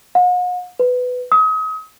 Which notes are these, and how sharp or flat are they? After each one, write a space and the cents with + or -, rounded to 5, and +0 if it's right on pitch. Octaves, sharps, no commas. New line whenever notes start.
F#5 -45
B4 +15
D#6 +35